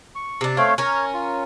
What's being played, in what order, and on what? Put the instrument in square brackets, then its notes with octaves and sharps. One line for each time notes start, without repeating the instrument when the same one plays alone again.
[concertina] C#6
[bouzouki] C3 D4
[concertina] A3 C#5 F5 [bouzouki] C4
[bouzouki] C#4 A#4 [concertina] C#5
[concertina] F4